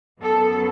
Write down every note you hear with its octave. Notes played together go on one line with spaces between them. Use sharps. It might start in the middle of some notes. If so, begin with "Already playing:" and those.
F#2 F#3 B3 A4